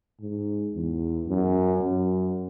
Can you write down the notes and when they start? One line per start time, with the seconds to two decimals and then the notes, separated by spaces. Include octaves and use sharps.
0.21 G#2
0.75 E2
1.27 F#2
1.81 F#2